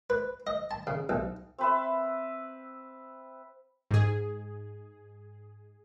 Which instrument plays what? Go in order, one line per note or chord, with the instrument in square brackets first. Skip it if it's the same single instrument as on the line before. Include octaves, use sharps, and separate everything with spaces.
[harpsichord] B4
D#5
A5
C#3
B1
[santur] C4 B4 E5
[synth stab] G#2 G#4